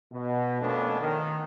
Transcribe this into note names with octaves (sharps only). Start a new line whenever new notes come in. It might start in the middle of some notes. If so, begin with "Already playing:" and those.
B2
F2 A#2 A3 B3 C#4 D4
D#3